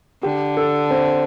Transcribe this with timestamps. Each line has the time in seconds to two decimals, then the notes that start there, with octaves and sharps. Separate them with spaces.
0.23 D3 G4
0.57 A4
0.90 C4 C5